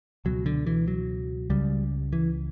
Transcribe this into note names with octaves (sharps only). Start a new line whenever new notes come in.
C#2 B2 F#3
D3
E3
F#3
C#2 C#3 G3
E3